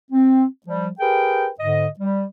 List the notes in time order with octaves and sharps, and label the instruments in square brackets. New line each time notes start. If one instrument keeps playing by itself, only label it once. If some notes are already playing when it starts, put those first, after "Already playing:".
[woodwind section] C4
F3 G3
G4 G#4 A#4 B4 G5
G#2 D3 D#5
G3